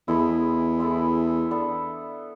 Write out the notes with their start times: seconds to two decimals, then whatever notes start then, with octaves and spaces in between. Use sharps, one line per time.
0.08 E2 G#3 B3 E4 A4
0.79 G#3 B3 E4 A4
1.51 B3 D4 A4